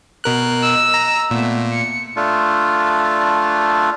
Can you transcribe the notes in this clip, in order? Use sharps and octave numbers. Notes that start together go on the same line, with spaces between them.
B2 A#4 F#6
D#5 E6
A#5
A#2 A3 B3
C#7
A3 D4 F4